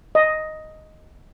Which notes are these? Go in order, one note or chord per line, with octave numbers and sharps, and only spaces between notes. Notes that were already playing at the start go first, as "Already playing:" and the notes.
D#5